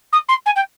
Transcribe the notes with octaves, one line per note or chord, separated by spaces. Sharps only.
D#6
C6
G#5
G5